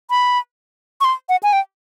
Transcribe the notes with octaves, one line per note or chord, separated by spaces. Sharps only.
B5
C#6
C6
F#5
G#5
G5